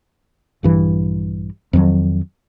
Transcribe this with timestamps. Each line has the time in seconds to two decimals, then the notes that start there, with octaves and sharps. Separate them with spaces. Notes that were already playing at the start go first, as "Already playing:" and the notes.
0.63 A#1 G2 E3
1.73 F2 D#3 F3 F#3